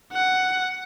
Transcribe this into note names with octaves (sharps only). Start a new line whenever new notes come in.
F#5